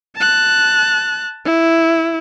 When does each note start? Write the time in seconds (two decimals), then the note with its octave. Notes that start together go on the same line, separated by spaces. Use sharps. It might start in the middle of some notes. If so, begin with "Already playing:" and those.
0.16 A5 F#6
1.45 E4